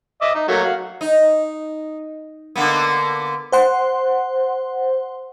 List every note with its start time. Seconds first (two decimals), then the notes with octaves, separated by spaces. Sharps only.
0.22 D#5 E5 D6
0.35 D#4
0.49 F#3 A3 A#3
0.64 F#4 F5
1.01 D#4
2.55 D3 A#3 B3
3.52 C5 F#5 C6